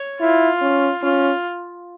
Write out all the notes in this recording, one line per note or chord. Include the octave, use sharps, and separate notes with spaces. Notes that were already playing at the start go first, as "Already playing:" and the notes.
Already playing: C#5
E4 F4
C#4
C#4 F4